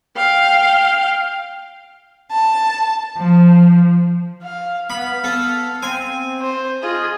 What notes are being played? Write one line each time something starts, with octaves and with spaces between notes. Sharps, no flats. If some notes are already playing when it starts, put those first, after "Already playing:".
F5 G5
A5
F3
F5
B3 F5 B5
B3 A4
C4 G#5
C5
F4 G#4 D#5